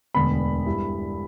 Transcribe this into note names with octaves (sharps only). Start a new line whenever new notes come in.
E1 D2 D3 B3 B5
G2 G3 E4